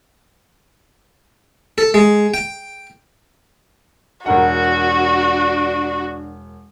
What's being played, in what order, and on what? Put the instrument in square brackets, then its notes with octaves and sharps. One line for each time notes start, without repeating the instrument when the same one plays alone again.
[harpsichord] A4
G#3
G5
[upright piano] E1 A#4 F#5 [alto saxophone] D4 [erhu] F#4